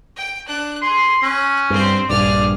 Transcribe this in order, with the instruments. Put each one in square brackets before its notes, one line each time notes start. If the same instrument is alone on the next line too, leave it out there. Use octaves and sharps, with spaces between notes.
[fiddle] G5
D4 F#6
[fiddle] G#4 [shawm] C6
[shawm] C#4 [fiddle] C#6 F#6
[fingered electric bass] G2 [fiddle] C4 C5
[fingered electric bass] A#1 G2 [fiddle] G#4 F6 [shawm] D5